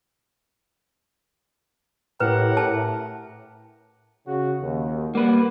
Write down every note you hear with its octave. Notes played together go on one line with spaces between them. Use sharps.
A2 G4 A#4 B4 F#5
A5
C#3 F#4
D#2
G3 A#3 B4 D5 F#5